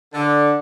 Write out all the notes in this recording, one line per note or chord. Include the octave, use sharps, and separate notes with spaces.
D3